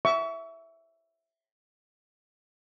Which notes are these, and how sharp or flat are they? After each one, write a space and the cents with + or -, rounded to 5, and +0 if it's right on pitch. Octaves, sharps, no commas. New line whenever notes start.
E5 +0 C#6 +35